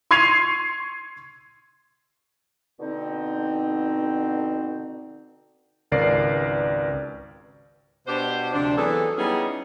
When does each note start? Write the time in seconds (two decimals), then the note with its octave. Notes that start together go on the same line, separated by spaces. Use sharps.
0.11 C6 C#6 G#6 C7 D#7 F7
2.80 B2 D3 C4 D#4
5.91 G#1 C#2 A#4 B4 D5 C7
8.08 B2 D4 F#4 G4 C5
8.53 D2 C3 F3 D4
8.77 E3 F#3 B3 G#4 A4
9.17 G3 B3 C#4 D#4 E4 G#4